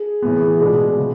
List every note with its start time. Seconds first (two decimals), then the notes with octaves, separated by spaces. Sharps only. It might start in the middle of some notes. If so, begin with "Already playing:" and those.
Already playing: G#4
0.22 A2 E3 B3
0.60 B2 G#3 D4
0.98 C#3